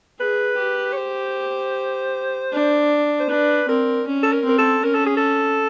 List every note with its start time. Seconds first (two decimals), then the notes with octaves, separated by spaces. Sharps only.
0.20 G#4 B4
0.58 G4
0.93 C#5
0.97 C5
2.52 D4
3.20 C5
3.29 D4 B4
3.68 C4 A#4
4.07 C#4
4.23 A4
4.32 A#4
4.45 C4 A#4
4.58 A4
4.84 C#4 A#4
4.95 A4
5.06 G#4
5.17 A4